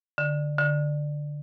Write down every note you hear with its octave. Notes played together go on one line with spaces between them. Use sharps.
D3
D3